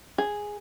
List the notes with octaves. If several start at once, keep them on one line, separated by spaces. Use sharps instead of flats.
G#4